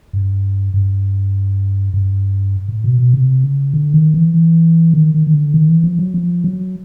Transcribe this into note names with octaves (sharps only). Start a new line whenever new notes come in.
G2
G2
G2
A2
B2
B2
C3
C#3
D3
D#3
E3
E3
D#3
D#3
D#3
D3
D#3
E3
F3
F#3
F3
F#3